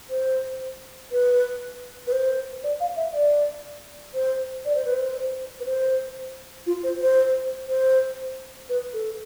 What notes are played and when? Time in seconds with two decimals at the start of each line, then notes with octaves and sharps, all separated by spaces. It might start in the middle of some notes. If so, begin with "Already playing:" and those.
0.10 C5
1.12 B4
2.07 B4
2.12 C5
2.63 D5
2.80 F5
2.96 E5
3.13 D5
4.14 C5
4.65 D5
4.75 C5
4.85 B4
4.94 C5
5.60 B4
5.65 C5
6.66 F4
6.83 C5
7.01 C5
7.68 C5
8.69 B4
8.93 A4